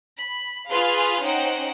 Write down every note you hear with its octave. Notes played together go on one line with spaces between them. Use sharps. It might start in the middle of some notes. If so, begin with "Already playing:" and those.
B5
F4 G#4 B4 F5 C6
C#4 D#4 C5 F#5 G5